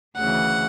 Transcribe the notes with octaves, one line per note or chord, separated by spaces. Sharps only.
D2 C#3 E3 F#5